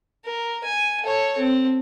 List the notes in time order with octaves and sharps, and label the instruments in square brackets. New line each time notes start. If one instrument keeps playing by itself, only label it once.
[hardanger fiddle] A#4
G#5
A4 C#5
C4